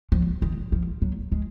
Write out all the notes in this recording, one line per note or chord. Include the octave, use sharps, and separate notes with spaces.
F3
D#3
F3
F#3
G#3